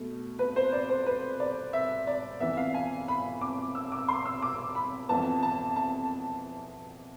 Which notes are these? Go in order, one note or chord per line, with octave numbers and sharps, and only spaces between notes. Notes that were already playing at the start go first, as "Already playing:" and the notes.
Already playing: B2 A3
B4
C5
D5
C5
B4
D5
E5
D5
F2 E3 B3 E5
F5
G#5
B5
D6
E6
D6
C6
E6
D6
B5
F2 E3 B3 A5
A5
A5